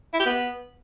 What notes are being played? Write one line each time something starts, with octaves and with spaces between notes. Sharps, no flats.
E4
G4
B3